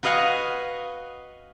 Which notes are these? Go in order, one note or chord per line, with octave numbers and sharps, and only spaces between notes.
F#4 B4 D#5 F5 F#5 G#5